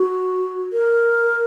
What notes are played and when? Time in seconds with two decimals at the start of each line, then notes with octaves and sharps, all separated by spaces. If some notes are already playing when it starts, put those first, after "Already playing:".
Already playing: F#4
0.73 A#4